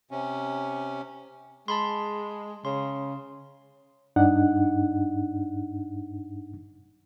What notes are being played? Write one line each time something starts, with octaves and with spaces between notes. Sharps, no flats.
C3 C#4
G#3 A5 B5 C6
C#3 C6
G2 D4 D#4 F#5